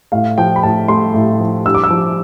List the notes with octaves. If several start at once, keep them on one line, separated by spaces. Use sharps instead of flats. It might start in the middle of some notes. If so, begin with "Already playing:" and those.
A2 F5
F3 G5
B5
A2 A5
A3 C6
A2
F3
G2 E6
D6
E6
F3